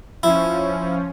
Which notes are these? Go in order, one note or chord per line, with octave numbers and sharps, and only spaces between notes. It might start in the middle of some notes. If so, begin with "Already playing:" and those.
F3 C#4 E4